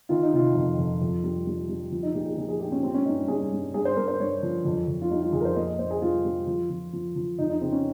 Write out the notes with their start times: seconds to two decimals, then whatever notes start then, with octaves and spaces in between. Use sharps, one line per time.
0.09 D#3 F4
0.23 D#4
0.33 C3 F4
0.55 F2
0.78 F2
1.01 F2
1.24 G3
1.46 G3
1.69 G3
1.92 F3
2.03 D#4
2.14 A#2 G4
2.25 G#4
2.37 F3 G#4
2.49 G#4
2.60 A#2 G4
2.72 C#4
2.83 G3 C4
2.94 C#4
3.05 G2 D#4
3.28 G3 G#4
3.51 G2
3.74 G2 G#4
3.85 C5
3.96 G2 A#4
4.08 C5
4.19 G2 C#5
4.42 F3
4.65 F2
4.88 F2
5.02 F4
5.11 G3 D#4
5.22 F4
5.33 F2 G#4
5.41 A#4
5.45 C5
5.56 A#2 D#5
5.67 D#5
5.79 A#2 C5
5.91 G#4
6.02 G3 F4
6.24 G3
6.47 F3
6.70 F3
6.93 F3
7.16 F3
7.38 F2 D#4
7.50 D#4
7.61 C#3 C4
7.72 C#4